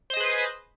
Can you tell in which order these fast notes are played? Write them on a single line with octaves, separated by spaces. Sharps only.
C5 D#5 G#4 B4